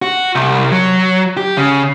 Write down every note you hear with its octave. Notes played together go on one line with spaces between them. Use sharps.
F#4
C2
F#3
G4
C#3